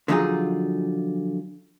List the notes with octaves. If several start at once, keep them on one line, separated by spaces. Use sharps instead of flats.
D3 F3 F#3 D#4 F4 G#4